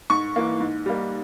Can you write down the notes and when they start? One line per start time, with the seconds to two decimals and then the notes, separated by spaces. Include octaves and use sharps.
0.10 G#2 C#6
0.36 E3 A#3
0.60 G#2
0.86 G3 A#3